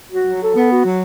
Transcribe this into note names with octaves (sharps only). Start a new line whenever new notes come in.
F#4
F#3
A4
B3
F#4
F#3